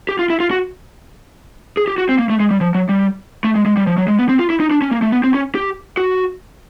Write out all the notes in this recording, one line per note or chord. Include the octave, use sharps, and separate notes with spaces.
G4
F4
E4
F4
F#4
G#4
G4
F#4
C4
A#3
A3
G#3
G3
F3
F#3
G3
A3
G#3
G#3
G3
F3
F#3
G#3
B3
C4
F4
E4
D#4
D4
C#4
A#3
A3
B3
C4
C#4
G4
F#4